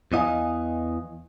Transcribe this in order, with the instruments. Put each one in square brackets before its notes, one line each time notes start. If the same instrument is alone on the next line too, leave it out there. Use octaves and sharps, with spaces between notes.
[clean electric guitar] E2 E3 D#5 F5 G#5